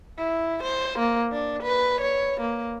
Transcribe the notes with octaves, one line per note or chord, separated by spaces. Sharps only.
E4
C5
A#3
D4
B4
C#5
A#3